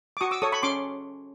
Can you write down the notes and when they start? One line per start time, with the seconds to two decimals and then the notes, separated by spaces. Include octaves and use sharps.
0.17 D6
0.21 F#4 C#6 D#6
0.31 D6 E6
0.42 A4 C#5 C#6 D#6
0.52 B5 C#6
0.63 C#4 C6 D6